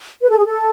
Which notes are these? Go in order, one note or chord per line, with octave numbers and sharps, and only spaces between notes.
B4
A4
G#4
A4